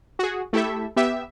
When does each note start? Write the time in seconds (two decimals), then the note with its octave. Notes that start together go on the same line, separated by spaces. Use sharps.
0.19 F#4 G#4
0.53 A3 E4 G4 A4 E5
0.96 B3 G4 E5